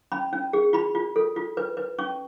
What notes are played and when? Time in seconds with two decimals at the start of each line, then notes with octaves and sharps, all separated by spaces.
0.12 C#4 B5
0.33 C#4
0.53 G#4
0.73 F4 B5
0.95 F4
1.16 A4
1.36 F4
1.57 B4
1.77 B4
1.98 C#4 C#6